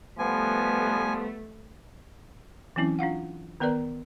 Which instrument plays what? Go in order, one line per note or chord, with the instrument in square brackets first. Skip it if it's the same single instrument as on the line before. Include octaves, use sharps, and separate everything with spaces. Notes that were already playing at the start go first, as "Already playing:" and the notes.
[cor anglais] F3 [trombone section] G3 B3 [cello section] A3 [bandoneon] G#5
[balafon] E3 F#3 C4 C#4 E4
D4 F4 F5 F#5
D#3 B3 A#4 B4 D5 A#5